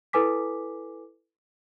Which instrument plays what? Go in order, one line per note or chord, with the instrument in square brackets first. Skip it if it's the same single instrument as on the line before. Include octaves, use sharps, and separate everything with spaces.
[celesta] E4 A4 B4 G#5 D6 B6